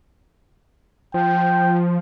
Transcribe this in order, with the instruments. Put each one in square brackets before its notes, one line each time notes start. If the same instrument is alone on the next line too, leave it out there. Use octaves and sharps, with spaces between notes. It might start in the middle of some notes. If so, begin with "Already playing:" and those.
[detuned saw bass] F3 [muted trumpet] G5